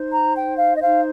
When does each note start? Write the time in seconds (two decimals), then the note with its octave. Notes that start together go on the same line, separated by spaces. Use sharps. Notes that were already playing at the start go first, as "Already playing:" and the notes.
Already playing: D#4 C5
0.12 A#5
0.35 G5
0.57 F5
0.76 D#5
0.80 D#4 C5 F5